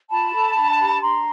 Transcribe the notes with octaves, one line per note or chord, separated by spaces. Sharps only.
F4 A5 B5
A4
D4
G4
D4 A#5 C6